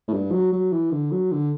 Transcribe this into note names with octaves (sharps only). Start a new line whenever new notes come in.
A2
G2
F#3
F#3
E3
D3
F#3
D3